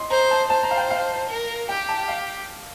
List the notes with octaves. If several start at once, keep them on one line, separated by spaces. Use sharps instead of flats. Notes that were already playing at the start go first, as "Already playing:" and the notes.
Already playing: D#5 C6
C5 A#5
A5
C5 A5
A#5
F5
G5
F5
A#4
G4 G5
A5
F5